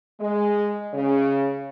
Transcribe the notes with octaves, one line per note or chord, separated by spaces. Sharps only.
G#3
C#3